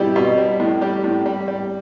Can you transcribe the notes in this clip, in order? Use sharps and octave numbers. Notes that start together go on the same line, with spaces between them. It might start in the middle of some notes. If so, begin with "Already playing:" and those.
Already playing: B2 G3 E4 G4
B2
G3
A2
G3 G4
A2
G3
G3